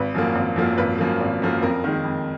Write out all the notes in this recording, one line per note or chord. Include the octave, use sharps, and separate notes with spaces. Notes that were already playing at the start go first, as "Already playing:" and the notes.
Already playing: G#1 B4
F#2 F3 A#3
G#1
F#2 F3 A#3
G#1 B4
F#2 F3 A#3
G#1
F#2 F3 A#3
F2 A#4
D#3 G#3
F2